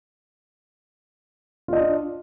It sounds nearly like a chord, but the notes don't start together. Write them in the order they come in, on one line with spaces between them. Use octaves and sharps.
F4 D#5 D4